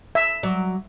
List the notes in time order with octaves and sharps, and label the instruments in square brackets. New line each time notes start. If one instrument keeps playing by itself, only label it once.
[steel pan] E5
[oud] F#3 D5